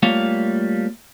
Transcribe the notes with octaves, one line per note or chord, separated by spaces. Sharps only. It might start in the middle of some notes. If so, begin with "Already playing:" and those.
G3 A3 A#3 F4 C#5 F5